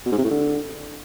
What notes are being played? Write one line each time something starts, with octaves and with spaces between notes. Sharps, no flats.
B2
G#2
C3
A2
D3